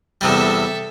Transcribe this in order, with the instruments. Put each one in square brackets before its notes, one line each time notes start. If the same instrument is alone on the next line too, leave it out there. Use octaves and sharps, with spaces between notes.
[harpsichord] E2 C3 G3 [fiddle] A4 E5